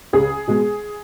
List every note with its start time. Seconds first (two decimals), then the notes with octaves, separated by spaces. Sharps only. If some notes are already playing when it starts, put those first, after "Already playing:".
0.13 C#2 G#4
0.47 B2 G#3